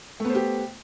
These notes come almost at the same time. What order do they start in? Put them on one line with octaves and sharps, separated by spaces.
A3 B3 C5 G4